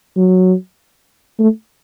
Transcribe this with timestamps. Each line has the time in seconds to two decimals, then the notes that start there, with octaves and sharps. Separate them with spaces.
0.17 F#3
1.39 A3